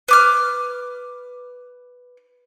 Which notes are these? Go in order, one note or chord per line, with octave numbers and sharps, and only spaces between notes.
B4 D6 F6